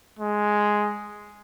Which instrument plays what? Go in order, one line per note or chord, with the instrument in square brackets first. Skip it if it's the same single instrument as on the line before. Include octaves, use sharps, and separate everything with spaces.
[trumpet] G#3